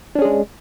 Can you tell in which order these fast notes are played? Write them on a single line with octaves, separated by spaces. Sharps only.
D4 C#4 G#4 G#3